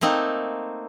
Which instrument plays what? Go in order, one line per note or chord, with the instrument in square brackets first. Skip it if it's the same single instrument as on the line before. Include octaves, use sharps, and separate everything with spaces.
[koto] A3 A#3 C4 D#4